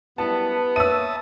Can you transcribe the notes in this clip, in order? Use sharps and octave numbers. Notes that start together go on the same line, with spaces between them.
F#2 G3 B3 E4 A5
A#3 B4 C#5 E5 A5 D#6 E6 D#7